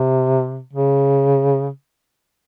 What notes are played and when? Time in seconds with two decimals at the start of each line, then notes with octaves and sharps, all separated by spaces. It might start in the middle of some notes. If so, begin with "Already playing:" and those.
Already playing: C3
0.73 C#3